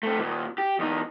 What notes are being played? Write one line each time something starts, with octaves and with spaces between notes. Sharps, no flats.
A3 C4
D#2 A#2
G4
E2 D#4